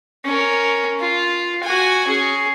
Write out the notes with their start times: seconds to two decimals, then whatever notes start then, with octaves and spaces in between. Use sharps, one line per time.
0.25 C#4 A#4
1.00 F4
1.63 F#4 G#5
2.07 C#4 G#4